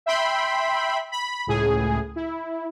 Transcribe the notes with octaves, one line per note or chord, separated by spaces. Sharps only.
E5 G5 B5 C6
B5
C#2 A2 G#4
E4